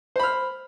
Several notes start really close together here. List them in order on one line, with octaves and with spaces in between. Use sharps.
C5 B5 F6